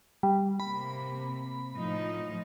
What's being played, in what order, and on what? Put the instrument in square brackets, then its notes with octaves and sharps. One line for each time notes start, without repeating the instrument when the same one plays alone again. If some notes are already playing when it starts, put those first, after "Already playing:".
[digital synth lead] G3
[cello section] C3 A#3 [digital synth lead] B5
[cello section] A2 F3 D#4